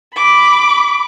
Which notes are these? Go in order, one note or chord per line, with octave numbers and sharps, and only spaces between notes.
B5 D6